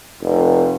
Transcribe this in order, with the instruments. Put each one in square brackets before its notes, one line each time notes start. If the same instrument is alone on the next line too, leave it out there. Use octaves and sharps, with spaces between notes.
[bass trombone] F1